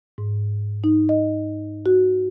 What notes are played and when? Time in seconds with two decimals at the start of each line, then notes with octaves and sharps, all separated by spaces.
0.18 G#2
0.84 D#4
1.09 D#5
1.86 F#4